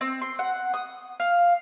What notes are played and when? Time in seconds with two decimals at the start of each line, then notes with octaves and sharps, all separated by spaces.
0.01 C4
0.21 C6
0.39 F#5
0.74 D#6
1.20 F5